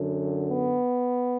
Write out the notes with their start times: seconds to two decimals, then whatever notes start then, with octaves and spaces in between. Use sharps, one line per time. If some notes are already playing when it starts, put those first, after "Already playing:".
Already playing: F#2 D3
0.48 B3